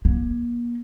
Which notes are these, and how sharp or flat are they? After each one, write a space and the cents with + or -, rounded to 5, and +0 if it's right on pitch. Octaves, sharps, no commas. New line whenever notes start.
A#3 +40